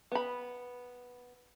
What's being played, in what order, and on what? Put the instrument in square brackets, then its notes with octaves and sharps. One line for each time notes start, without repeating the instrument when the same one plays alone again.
[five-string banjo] B3 B5